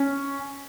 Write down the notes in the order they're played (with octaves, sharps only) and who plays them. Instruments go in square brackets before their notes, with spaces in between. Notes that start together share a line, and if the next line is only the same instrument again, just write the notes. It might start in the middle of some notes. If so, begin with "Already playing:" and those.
Already playing: [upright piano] C#4